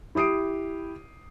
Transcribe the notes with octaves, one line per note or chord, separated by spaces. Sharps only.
E4 G4 D#6 C7 D7